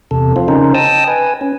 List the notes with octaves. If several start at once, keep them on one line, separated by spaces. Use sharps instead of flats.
E2 C3 A4
F3 C4 F4
C#3 C#4 D#4 A#4 C5
D#5 G5 A5 D#6 E6
B4 G#5
C#4